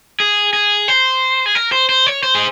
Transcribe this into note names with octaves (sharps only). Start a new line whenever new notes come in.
G#4
G#4
C5
G#4
A#4
C5
C5
C#5
C5
G#4